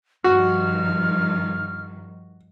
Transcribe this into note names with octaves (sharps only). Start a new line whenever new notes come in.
G2 D#3 F3 F#4 F6